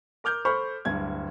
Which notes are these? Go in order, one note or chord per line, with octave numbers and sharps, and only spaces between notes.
A#4 D6 F6 G6
A4 C5 B5 C#6 F6
D1 G2 G#6